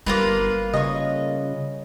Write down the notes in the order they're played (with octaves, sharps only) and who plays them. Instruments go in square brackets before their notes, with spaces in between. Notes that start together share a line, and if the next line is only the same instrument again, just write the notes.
[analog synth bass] G1 [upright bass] G3 [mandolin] A#3 F4 B4
[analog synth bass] C#3 [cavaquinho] C#5 D#5